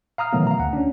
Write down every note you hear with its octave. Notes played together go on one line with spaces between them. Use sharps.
F5 A#5 D#6 F6
B2 D#3 E3 F#3 A3 B3
F5 A#5
D2 F#5
C#4 D4